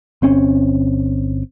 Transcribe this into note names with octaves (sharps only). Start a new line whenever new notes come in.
G1 C4 C#4